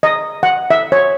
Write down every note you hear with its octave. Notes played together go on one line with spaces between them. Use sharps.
D#5
F#5
E5
C#5